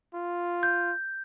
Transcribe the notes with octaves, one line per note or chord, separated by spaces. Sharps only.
F4
G6